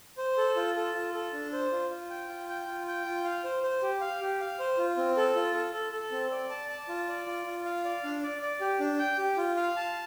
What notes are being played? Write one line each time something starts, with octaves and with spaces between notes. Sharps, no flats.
C5
A4
F4
A4
F4
A4
D4
C5
F4
F4
G5
F4
G5
F4
G5
F4
F5
C5
C5
G4
F5
G4
F5
C5
F4
C4
A4
F4
A4
A4
A4
C4
D5
A5
A5
F4
D5
F4
F4
F5
D5
D4
D5
D5
G4
D4
G5
G4
F4
F5
A5